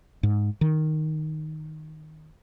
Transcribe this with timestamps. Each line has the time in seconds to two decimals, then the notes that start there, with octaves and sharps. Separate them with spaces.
0.23 G#2
0.61 D#3